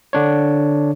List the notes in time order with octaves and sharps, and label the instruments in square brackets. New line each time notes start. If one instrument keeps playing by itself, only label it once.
[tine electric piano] D3 D4 C#5